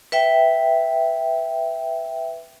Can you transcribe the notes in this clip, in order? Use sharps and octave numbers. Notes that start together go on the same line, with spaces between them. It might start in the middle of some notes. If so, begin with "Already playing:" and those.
B4 E5 G5